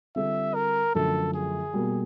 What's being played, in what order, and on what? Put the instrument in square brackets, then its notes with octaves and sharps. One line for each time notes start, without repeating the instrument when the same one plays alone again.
[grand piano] D3 G3 C4 F4 A4 [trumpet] E5
[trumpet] A#4
[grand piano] F#2 D3 F3 A3 [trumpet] A4
[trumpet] G#4
[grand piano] B2 G3 A#3